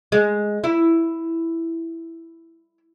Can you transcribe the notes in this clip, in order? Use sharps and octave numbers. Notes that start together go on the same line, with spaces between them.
G#3
E4